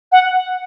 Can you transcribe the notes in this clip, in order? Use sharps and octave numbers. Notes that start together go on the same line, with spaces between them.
F#5